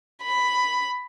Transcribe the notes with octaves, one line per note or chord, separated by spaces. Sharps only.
B5